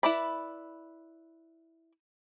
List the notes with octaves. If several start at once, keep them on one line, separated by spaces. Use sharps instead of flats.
E4 B4 D5 B5